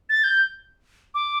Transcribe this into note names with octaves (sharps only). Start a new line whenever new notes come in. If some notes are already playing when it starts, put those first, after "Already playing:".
A6
G6
D6